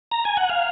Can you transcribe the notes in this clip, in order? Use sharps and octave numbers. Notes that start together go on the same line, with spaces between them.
A#5
G#5
F#5
F5